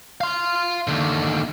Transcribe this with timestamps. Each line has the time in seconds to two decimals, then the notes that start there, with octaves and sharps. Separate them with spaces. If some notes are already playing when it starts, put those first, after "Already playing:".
0.21 F5 C6
0.88 D#2 D3